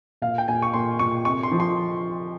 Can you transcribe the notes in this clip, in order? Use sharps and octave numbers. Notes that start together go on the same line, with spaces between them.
A#2 F5
G5
A#2 G#5
C#6
A#2 C6
A#2 C#6
C3 C#6
C6
F3
C6